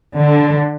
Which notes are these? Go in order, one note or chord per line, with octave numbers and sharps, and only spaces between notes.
D3